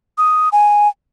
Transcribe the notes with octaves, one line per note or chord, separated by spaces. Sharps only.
D#6
G#5